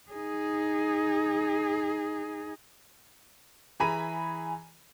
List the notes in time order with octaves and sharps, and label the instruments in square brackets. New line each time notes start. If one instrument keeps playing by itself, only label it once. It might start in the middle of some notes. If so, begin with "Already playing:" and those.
[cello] D#4 G#4
[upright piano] E3 G#4 G#5 A#5 B5 D#7